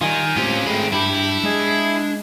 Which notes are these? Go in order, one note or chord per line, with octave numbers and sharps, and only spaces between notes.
D#3 G3 D#4 F4 G#5
A2 C4 C#4 F4 G4
G#2 G#3 A3 C4 B5
G2 D4 E4 G4 B5
G#3 G#4 D#5